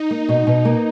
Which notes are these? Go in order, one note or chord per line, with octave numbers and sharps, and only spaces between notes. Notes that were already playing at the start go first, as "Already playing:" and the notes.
Already playing: D#4
A#3
B2
B2
A#3